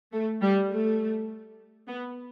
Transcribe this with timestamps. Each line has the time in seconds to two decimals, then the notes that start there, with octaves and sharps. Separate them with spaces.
0.13 A3
0.42 G3
0.71 A3
1.88 B3